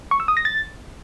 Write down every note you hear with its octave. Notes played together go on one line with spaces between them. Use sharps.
C#6
E6
D#6
A#6
A6